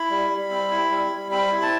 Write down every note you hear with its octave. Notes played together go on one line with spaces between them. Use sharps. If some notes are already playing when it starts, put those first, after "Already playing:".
Already playing: E4 B5
G3
G3
C4
E4
G3
G3
C4 B5
E4
A5